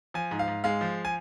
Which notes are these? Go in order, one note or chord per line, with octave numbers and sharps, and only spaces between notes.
F3 G#5
G#2
F5
G#2
G#3 F5
F3
G#5